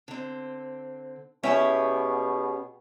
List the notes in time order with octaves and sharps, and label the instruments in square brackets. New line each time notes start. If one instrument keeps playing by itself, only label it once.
[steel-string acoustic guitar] D3 C4
[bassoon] B2 [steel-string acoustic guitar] C#4 G4 G#4 [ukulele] E4 E5 G#5